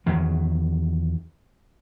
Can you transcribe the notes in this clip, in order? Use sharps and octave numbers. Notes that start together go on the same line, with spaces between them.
E2 D#3 F#3